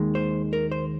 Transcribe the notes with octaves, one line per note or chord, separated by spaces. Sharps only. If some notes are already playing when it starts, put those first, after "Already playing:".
Already playing: D#2 D#3 G#3
C5
A#4
C5